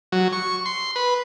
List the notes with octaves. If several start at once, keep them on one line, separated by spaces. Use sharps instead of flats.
F#3
C#6
C6
B4